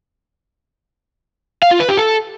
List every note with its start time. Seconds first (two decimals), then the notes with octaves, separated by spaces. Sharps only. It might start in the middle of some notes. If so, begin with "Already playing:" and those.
1.62 F5
1.71 F4
1.80 B4
1.89 G4
1.97 A4